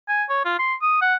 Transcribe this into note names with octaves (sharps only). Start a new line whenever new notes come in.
G#5
C#5
F4
C6
D#6
F#5